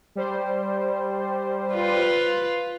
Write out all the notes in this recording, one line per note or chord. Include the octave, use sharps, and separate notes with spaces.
G3 C5
F4 B4